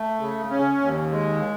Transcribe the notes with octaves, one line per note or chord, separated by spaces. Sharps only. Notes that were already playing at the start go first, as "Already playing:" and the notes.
Already playing: A3
C#3
C#4
D#2
G#3